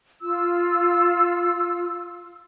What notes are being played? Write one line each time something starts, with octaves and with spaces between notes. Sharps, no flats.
F4 E6